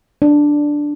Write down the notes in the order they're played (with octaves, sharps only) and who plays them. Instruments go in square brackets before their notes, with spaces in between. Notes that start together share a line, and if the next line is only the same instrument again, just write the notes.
[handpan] D4